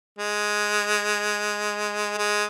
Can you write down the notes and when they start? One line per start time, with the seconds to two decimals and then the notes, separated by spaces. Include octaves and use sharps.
0.19 G#3
2.18 G#3